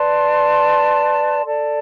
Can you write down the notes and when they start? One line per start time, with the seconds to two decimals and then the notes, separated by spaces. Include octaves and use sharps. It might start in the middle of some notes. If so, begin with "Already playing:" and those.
Already playing: B4 D5 A5 C6
1.44 A4 D5 A5